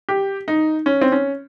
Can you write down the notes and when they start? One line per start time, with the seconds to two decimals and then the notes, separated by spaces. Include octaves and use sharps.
0.09 G4
0.48 D#4
0.86 C#4
1.01 C4
1.12 C#4